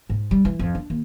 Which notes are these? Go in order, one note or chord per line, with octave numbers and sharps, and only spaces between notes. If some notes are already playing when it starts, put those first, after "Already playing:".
G#2
G3
E3
F2
D4
D#2